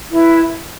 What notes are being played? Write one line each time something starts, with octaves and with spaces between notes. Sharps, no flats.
E4 B4